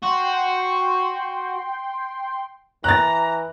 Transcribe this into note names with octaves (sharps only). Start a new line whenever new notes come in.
F#4 G5 C6
E3 A#5 F#6 A6